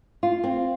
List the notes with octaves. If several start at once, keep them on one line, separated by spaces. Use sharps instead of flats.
F4
C4